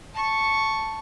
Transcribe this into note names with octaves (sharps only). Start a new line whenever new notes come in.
A5 C#6